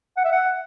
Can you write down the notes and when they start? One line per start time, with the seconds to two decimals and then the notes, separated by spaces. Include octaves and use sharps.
0.17 F#5
0.25 E5
0.32 F#5